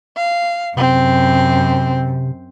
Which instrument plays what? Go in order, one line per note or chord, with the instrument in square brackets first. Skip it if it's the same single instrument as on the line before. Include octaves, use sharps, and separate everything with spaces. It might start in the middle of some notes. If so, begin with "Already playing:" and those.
[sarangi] F5
[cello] F#2 [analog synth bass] C3 [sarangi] C4